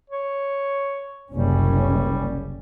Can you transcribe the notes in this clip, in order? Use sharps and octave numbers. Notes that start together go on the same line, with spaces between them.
C#5
F#1 C2 G3 C#4